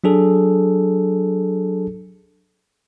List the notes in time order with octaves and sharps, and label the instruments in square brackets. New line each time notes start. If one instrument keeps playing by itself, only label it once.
[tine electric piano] F#3 D4 G#4 A4